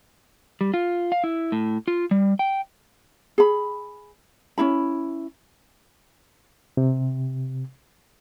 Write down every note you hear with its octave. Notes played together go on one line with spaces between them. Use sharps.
G3
F4
F5
E4
A2
F4
G3
G5
G#4 B5
C#4 D4 E4 B5
C3